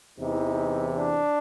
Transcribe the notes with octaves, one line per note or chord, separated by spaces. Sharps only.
E2 C3 E3 D#4
D4